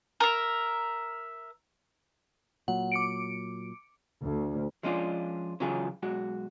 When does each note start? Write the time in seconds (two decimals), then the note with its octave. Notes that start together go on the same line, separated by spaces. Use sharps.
0.20 A#4 E5
2.68 A#2 F#3 F#5
2.92 D6 C#7 D7
4.24 D2
4.83 F3 G#3 C#4 D4 F4
5.60 C#3 E3 F#3 C#4 F4 G#4
6.02 B1 G#3 F#4